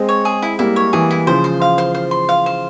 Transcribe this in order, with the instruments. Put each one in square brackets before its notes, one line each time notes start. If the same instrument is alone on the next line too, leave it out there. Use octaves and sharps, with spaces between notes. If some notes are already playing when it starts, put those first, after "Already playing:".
Already playing: [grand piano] G#3 C4
[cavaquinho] C#5
G#4
E4
[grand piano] G3 A#3 [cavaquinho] E4
[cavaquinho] C#5
[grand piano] E3 [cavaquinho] G#4
[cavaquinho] E4
[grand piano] C#3 F3 [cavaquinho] C5
[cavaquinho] C6
F5
C5
C5
C6
F5
C5